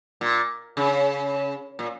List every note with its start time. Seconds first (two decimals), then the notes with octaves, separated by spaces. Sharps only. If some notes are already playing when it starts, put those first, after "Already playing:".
0.21 A#2
0.77 C#3
1.79 A#2